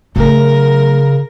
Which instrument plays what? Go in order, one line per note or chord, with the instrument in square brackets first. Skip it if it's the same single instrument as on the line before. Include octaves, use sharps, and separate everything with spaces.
[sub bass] C#3 [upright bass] F#3 A3 [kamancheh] A#4